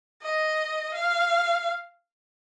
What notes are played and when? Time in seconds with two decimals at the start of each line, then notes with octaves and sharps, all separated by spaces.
0.23 D#5
0.94 F5